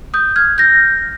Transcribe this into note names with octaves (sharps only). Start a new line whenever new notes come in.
D#6 G6
F6 G#6
G6 A#6